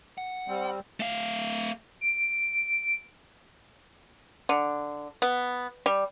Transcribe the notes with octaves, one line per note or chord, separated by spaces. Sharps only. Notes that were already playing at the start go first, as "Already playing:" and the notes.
F#5
G3 C4
A3 F5
D7
D3
B3
G3